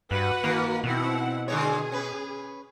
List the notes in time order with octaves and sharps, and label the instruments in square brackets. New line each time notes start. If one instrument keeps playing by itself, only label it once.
[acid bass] G2 [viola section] F#4 B4 F#5
[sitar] D#3 [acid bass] A#3
[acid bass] B2 [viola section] C4 E4 F#5
[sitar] D3 G#3 C#5 [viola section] G#4
[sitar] C#4 B4